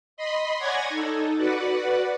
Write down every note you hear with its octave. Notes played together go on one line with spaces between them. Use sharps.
D#5 B5 C6
C#5 D5 F#5 G#5 G#6 A#6
D#4 A4
F#4 B4 D5 F#5